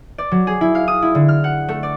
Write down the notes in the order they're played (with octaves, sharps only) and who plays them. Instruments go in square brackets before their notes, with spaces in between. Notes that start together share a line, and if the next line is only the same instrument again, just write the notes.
[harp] D5
F#3
G#4
E4
F5
D#6
E4
D3
F6
F#5
A3
D5